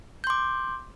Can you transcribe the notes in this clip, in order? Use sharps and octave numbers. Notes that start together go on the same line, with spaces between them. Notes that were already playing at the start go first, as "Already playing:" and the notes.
C6 D6 G6